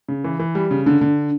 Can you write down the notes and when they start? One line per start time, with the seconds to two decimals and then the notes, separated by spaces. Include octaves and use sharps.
0.09 C#3
0.24 E3
0.39 E3
0.55 G3
0.71 C#3
0.86 D3
1.01 D3